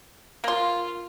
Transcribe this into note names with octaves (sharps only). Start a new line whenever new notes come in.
A#3 F4 C6